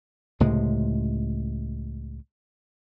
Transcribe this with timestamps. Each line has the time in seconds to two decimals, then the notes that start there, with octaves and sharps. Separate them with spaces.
0.40 C#2 A2 C3 G#3